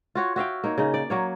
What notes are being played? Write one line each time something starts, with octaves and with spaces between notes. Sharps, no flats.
F4 F#4 C#5
F#4 E5 F5 G5
A#3 D#4 C#5
C#3 D#4
D5
F#3 A#3 C#5